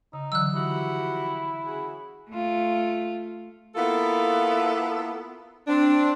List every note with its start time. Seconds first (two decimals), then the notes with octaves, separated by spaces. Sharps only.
0.13 C#3 D#4
0.32 D3 E3 F#3 E6 F#6
0.54 F3 E4 F#4 G4
1.65 C#3 F#4 G#4
2.29 A3 F4
3.75 A#3 B3 E4 F4 A4
5.67 C4 D4